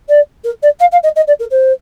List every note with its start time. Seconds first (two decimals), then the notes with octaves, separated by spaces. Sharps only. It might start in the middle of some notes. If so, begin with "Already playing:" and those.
0.09 D5
0.44 A#4
0.62 D5
0.79 F5
0.91 F5
1.03 D#5
1.16 D#5
1.27 D5
1.39 A#4
1.50 C5